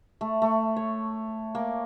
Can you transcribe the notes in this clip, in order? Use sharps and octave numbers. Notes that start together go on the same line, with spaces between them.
A3
A3
C#5
A#3